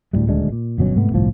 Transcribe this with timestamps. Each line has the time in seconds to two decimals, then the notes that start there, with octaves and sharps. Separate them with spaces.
0.13 D2 A2 G3 G#3
0.27 D#1 D2 G#3 D4
0.52 A#2
0.78 G1 B2 F#3 C#4
0.96 G#2 C3 A3 B3
1.12 G1 C2 A2 F3